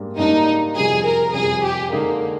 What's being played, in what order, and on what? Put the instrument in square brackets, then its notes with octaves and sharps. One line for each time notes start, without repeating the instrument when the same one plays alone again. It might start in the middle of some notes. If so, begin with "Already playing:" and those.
Already playing: [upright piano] G#2 G3 A#3 D4
[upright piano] G#2 G3 A#3 D4 [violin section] D#4
[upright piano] F2 C3 G3 [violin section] G#4
[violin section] A#4
[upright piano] F2 C3 G3 [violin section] G#4
[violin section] G4
[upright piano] D3 G#3 D#4 G#4 [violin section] A#3